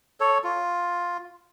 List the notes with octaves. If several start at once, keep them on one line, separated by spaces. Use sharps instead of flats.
A4 C#5
F4